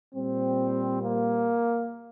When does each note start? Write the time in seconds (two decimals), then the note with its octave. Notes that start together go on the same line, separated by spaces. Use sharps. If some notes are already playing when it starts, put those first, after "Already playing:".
0.14 A#2 G3 C4
1.03 A#3